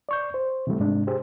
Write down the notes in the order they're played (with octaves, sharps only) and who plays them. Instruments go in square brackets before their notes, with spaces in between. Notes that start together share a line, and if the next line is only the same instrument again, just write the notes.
[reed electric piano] D5 C#6 G6
C5
C3 E3 G3 A3
G#2 C3 G#3 D4
G4 G#4 C5